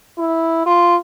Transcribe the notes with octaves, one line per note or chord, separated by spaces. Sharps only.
E4
F4